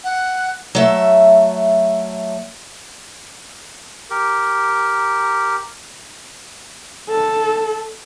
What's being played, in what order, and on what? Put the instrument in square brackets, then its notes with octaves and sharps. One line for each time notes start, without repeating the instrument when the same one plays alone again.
[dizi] F#5
[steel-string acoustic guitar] F#3 A3 E5
[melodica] G4 A#4
[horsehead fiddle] A4